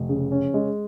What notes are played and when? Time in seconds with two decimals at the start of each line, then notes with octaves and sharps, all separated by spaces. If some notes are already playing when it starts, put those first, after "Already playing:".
Already playing: F1
0.09 C#3
0.32 C#4
0.54 G#3